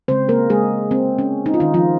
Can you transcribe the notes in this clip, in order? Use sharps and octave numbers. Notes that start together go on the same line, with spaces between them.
C#3 G#3 C4 C5
A#3 A#4
G#3 G#4
C4
C#4
D#4
F4
D#3 D#4
F3 F4